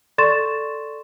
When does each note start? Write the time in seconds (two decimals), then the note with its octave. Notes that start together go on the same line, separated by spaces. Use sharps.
0.18 A4 D5 C6 C#6 A6 E7